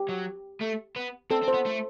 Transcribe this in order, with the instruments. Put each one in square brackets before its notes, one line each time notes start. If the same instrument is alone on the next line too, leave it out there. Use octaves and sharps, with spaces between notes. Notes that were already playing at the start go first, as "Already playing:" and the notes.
Already playing: [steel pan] G4
[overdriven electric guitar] F#3
A3
B3
[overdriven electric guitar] C4 [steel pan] A4
[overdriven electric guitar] C4
[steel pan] C5
[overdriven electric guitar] B3
A3